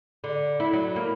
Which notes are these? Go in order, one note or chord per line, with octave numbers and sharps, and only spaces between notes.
D3
E4
F#3
A#3